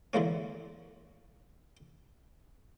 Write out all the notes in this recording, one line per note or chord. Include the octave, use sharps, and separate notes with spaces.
D3 E3 G#3 A#3 C#4